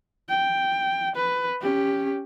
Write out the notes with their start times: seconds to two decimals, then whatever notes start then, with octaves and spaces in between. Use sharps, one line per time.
0.29 G5
1.16 B4
1.61 C#4 G4